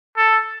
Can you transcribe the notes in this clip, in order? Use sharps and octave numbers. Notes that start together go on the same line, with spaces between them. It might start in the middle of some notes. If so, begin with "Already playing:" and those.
A4